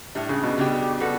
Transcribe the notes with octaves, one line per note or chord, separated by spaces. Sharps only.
A2 G3 D4
C#3
B2
C#3 G3 D4 G4
G3 B3 F#4 A4